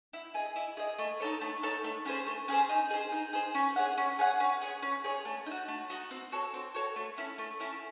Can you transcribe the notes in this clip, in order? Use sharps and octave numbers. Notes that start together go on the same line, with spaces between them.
E4
G#4 D#5
E4
G#4 D#5
A3
D#4 A4 C#5
A3
D#4 A4 C#5
A3
C#4 G#4 C5
A3
C#4 G#4 C5
D#4
G#4 C5
D#4
G#4 C5
C#4
G#4 C#5 F#5
C#4
G#4 C#5 F#5
C#4
G#4 C#5
C#4
G#4 C#5
A3
D#4
F#4
A3
D#4 F#4
C4
F#4 A4 C#5
C4
F#4 A4 C#5
A3
C#4 E4 A4
A3
C#4 E4 A4